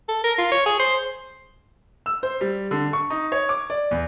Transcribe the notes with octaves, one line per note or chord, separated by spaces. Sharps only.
A4
A#4
F4
C#5
G#4
C5
E6
C5
G3
D3
C#6
D#4
C#5
D6
D5
E2